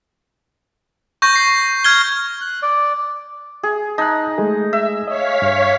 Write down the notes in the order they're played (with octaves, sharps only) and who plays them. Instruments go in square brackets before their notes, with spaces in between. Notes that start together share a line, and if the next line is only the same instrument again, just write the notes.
[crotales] C#6 G6 A#6
A#6 C7
F6 G#6 G7
[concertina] F#6
D5
[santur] G#4
[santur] D#4 [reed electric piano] A5 F#6
[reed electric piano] G#3 A3 G#4
[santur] E5
[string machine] C#5 F5 B6 [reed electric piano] D#5
[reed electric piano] G2